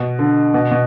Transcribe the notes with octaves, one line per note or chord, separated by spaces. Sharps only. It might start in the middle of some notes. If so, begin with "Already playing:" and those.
Already playing: B2
D3
B2
B2